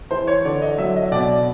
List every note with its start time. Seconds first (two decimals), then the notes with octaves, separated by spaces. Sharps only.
0.11 E3 C5
0.28 C#5
0.45 D3 D5
0.62 D#5
0.78 F#3 E5
0.96 D#5
1.12 B2 D5